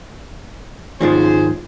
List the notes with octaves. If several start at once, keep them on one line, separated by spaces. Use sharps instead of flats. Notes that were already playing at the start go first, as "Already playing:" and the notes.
D#2 G#2 G#3 C#4 F4 G#4 C5 A6